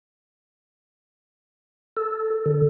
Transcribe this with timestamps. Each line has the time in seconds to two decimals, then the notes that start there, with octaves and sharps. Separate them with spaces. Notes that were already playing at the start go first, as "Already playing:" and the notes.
1.97 A4
2.46 D3